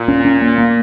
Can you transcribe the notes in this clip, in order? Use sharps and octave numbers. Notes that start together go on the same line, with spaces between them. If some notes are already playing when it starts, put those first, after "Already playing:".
Already playing: A#2
C#4
C#4
A#3
A#3